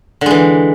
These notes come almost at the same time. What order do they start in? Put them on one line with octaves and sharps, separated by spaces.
D3 G#3 E3